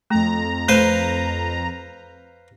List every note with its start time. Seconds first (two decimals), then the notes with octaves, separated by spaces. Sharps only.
0.10 F2 A3 A#5
0.69 A3 B4 C5 F5